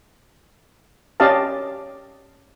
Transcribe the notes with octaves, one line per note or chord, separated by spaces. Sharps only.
C#4 G4 D5 D#5 F5 A5